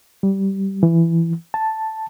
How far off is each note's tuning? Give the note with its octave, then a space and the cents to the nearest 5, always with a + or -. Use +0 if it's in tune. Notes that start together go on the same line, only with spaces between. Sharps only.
G3 -15
E3 +15
A5 +0